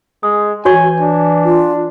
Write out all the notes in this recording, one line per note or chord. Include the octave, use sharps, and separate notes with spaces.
G#3 D#6
E3 F#4 C#5 G#5 C#6
D4
F4